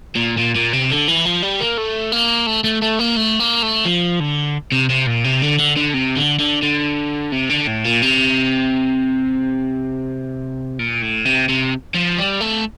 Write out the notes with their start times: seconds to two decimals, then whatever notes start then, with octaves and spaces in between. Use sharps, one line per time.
0.16 A#2
0.39 A#2
0.56 A#2
0.73 C3
0.91 D3
1.08 E3
1.25 F3
1.43 G3
1.60 A#3
1.77 A3
2.12 A#3
2.47 A3
2.64 A3
2.82 A3
2.99 A#3
3.16 A3
3.39 A#3
3.62 A3
3.86 F3
4.20 D3
4.72 C3
4.90 C3
5.07 A#2
5.24 C3
5.42 D3
5.59 D3
5.76 D3
5.94 C3
6.17 D3
6.40 D3
6.63 D3
7.32 C3
7.49 D3
7.67 A2
7.84 A#2
8.02 C3
10.79 A#2
11.02 A2
11.25 C3
11.49 C3
11.94 F3
12.18 G3
12.41 A3